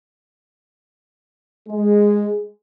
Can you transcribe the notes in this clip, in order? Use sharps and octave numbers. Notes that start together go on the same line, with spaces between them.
G#3